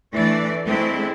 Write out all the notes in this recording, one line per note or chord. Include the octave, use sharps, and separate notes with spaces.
E3 A3 D4 D5
G#3 A3 C4 D4 E4